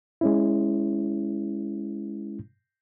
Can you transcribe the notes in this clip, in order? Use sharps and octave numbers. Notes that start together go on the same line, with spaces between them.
G#3 C#4 E4